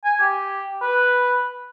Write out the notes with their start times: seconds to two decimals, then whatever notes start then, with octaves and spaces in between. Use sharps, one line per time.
0.04 G#5
0.20 G4
0.82 B4